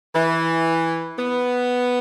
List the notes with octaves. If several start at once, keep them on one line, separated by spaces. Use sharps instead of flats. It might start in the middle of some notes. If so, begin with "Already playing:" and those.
E3
B3